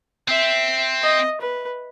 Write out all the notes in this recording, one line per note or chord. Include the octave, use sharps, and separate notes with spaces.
C4 E5
D#5
B4